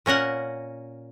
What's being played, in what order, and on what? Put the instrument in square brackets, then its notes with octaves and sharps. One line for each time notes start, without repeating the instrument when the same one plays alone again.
[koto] A#2 C#4 A#4 F#5